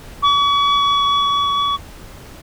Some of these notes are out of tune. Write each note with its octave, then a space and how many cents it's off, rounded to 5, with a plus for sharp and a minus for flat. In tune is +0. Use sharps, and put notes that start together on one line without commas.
C#6 +40